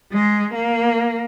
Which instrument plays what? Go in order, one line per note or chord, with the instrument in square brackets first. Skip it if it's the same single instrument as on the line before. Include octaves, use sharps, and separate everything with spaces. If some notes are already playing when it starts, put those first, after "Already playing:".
[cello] G#3
A#3